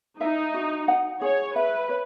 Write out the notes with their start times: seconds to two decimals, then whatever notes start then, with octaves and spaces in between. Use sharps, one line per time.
0.21 D#4 E5
0.54 F#4
0.88 F#5
1.21 G#4 C#5
1.55 B4 E5
1.89 C#5